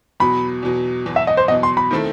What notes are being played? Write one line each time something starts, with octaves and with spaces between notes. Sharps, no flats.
E2 B2 F#3 B5
E2 B2 F#3
E2 B2 F#3
E5
D#5
C5
E2 B2 F#3 D#5
C6
B5
D#3 A3 C4 E4 A4